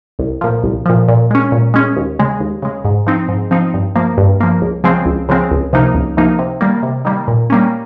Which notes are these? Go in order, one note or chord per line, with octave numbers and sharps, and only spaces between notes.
C2
A#2 F3
C2
A#2 F3
A#2
G#3 C#4
A#2
G#3 C#4
D#2
C#3 G#3
D#2
C#3 G#3
G#2
F3 C4 D#4
G#2
F3 C4 D#4
G2
F3 A#3
G2
F3 A#3
C#2
C#3 F3 G#3 C4
C#2
C#3 F3 G#3 C4
C#2
C3 F3 A#3 D#4
C#2
C3 F3 A#3 D#4
C3
D#3 G3 A#3
C3
D#3 G3 A#3
A#2
G3 A#3 C#4